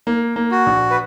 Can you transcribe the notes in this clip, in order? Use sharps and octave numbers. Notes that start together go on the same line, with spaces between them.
A#3
A#3
F#4
A#1
B4